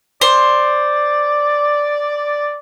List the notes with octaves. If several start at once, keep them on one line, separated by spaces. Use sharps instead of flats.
C5 D5